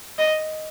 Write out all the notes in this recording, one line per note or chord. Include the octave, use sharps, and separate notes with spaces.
D#5